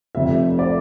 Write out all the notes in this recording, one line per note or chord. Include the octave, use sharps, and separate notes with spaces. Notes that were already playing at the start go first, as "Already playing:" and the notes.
F1 F2 C3 E5
D5